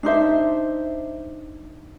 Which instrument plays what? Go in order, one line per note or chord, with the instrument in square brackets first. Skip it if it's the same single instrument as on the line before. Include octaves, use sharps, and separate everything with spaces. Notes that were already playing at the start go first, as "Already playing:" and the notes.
[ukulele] D4 D#4 C5 E5